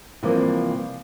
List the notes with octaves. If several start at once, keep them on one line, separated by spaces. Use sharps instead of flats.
C3 E3 F3 G3 A#3